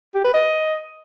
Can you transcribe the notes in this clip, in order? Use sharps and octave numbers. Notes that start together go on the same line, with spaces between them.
G4
B4
D#5